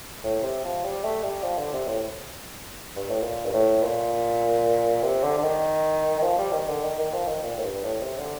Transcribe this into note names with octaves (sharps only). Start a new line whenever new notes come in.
A2
C3
F3
G3
A3
G3
F3
D3
C3
A2
G2
A2
A#2
G2
A2
A#2
C3
D3
D3
D#3
D#3
F3
G3
D#3
D3
D#3
D#3
F3
D#3
A#2
A2
G2
A2
C3
D3